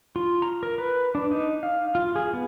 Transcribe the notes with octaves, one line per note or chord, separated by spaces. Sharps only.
F4
A#5
A#4
B4
D4
D#4
F5
F4
G#4
B3